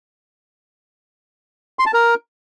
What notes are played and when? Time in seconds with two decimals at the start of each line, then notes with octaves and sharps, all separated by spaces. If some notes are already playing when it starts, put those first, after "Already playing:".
1.79 C6
1.86 A5
1.94 A#4